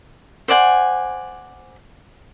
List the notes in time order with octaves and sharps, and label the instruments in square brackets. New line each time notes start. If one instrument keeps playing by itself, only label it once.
[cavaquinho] C5 D5 F#5 G#5